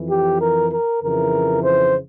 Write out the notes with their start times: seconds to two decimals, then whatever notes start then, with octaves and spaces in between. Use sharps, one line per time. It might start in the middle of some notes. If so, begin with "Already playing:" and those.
Already playing: F2 E3
0.10 G4
0.40 A#4
0.71 A#4
1.01 F2 C#3 E3 A#4
1.63 C5